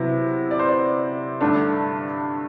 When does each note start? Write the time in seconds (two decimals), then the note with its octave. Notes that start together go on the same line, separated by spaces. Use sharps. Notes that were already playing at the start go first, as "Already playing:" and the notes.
Already playing: C3 F#3 B3 E4
0.51 D5
0.59 C5
0.69 D5
1.41 G2 D3 A3 D4